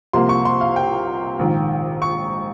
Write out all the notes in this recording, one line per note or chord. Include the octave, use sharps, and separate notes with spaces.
C2 C3 F3 A#3 C6
C#6
C6
F5
G5
A#1 G#2 D#3
C#6